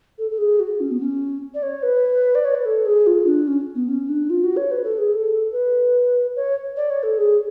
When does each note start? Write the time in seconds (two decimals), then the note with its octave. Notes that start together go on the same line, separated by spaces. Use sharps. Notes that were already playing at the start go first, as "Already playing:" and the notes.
0.18 A4
0.31 A4
0.38 G#4
0.60 F#4
0.80 C#4
0.91 B3
1.01 C#4
1.54 D5
1.63 C#5
1.83 B4
2.35 D5
2.45 C#5
2.55 B4
2.65 A4
2.86 G#4
3.07 F4
3.26 D4
3.48 C#4
3.75 B3
3.88 C#4
4.09 D4
4.30 F4
4.43 F#4
4.57 C#5
4.71 B4
4.84 A4
4.98 G#4
5.12 A4
5.52 B4
6.36 C#5
6.76 D5
6.90 C#5
7.03 A4
7.18 G#4